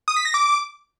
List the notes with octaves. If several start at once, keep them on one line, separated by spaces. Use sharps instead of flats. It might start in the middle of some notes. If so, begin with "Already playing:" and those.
D#6
B6
A#6
D6